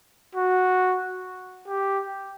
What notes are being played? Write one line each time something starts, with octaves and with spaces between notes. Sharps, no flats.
F#4
G4